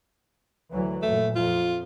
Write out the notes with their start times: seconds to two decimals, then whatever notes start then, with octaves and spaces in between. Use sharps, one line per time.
0.71 D2 E3 F#3
1.03 F#2 A#2 A3
1.36 F2 F4